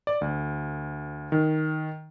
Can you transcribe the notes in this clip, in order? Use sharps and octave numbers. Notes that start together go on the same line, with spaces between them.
D5
D2
D#3